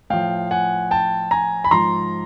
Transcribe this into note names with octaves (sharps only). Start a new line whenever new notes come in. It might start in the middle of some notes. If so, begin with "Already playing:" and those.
A2 F3 F5 G5
F#5 G#5
G5 A5
G#5 A#5
B5
G#2 F3 A#5 C6